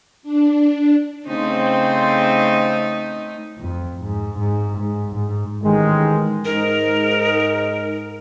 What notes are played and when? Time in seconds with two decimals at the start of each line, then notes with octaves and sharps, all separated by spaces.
0.23 D4
1.27 C#3 A3 C4 D#4 C5
3.59 F2
4.04 G#2
4.39 G#2
4.78 G#2
5.15 G#2
5.62 A1 D#3 G#3
6.45 G#2 D#4 A#4